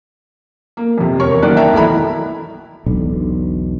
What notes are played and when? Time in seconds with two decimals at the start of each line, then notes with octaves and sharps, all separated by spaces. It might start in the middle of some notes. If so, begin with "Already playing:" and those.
0.77 A#3
0.98 F2 C3
1.20 E1 A#4 C#5 C#6
1.42 F#2 D#3 A#3 D5 F#6
1.56 A#4 E5 G5 A5 A#5
1.73 B1 E3 A3 E4 A#5 B5
2.86 E1 B1 D3